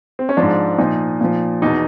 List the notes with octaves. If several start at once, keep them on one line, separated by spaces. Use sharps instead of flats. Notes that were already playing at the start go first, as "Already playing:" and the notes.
C4
C#4
G#2 F3 D4
A#2 F3 D#4
A#2 F3
E2 B2 D#4